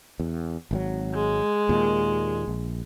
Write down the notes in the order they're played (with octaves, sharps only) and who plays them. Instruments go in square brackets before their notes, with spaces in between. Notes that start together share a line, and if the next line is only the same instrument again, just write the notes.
[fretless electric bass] E2
G#1 D#3 F#3
[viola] G#3
[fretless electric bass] D#2 A#2
A#1